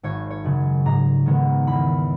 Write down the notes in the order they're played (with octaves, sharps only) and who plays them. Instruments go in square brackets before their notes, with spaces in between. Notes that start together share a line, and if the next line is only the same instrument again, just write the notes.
[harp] G#1 C#5
C#5
F#2 C#3
G#2 A#5
D#3 G#3 B3
E2 B5